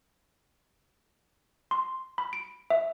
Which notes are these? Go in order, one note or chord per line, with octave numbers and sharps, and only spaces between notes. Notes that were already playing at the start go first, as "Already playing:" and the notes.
C6
B5
D7
E5